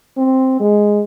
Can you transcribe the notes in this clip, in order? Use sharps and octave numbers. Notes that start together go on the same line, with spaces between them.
C4
G#3